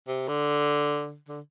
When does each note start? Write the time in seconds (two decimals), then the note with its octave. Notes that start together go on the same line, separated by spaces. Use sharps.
0.08 C3
0.28 D3
1.28 D3